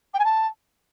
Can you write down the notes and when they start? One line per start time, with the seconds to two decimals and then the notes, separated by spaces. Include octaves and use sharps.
0.14 G5
0.19 G#5
0.24 A5